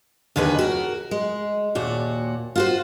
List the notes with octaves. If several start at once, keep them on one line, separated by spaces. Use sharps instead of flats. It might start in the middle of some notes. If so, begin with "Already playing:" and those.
D#2 D3 D#3 G#4 B4
F#4 A#4
G#3
D#2 A#2 F#4
F4 F#4 C5